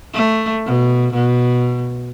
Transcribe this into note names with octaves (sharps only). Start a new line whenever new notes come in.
A3
B2
B2